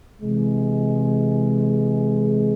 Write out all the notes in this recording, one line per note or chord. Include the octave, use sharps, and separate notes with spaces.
C3 E3 G#3